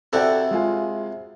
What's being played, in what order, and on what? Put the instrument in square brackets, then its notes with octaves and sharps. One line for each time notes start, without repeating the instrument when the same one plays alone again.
[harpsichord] C3 E4 F#4 [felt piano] A4 D5 G5
[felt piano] G#3 F4 G#5